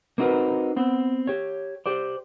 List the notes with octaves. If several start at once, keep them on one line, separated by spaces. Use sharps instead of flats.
A#3 C4 D#4 F#4 A#4 B4
B3 C4
G4 C#5
G4 C5 D5